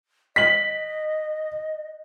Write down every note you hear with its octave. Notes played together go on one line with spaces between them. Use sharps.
D#5 B6 F#7